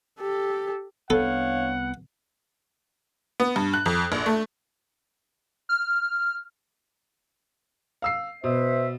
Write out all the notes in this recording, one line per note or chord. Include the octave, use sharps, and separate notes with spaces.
G4 A4
C2 B3 D4 A4 C#5 F5 F#5
B3
G2
F#6
F2
A#1
A3
F6
F5 E6 C7
B2 B4 C5 E5